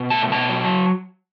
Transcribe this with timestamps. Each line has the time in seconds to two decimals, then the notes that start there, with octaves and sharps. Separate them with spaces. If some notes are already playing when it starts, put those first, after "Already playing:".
Already playing: B2
0.10 A3 A5
0.30 B2 A5
0.48 F#3